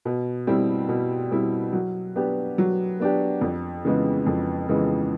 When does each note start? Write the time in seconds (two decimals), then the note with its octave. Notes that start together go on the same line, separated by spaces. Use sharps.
0.05 B2
0.47 G3 C4 E4
0.88 B2
1.31 G3 C4 E4
1.73 F#3
2.16 B3 D4 G4
2.58 F#3
3.00 B3 D4 G4
3.41 F2
3.85 C#3 E3 G#3 B3
4.26 F2
4.68 C#3 E3 G#3 B3